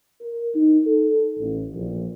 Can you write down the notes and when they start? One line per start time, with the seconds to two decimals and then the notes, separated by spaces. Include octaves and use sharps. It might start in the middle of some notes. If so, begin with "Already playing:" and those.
0.21 A#4
0.55 D#4
0.86 A4
1.39 A1
1.73 A#1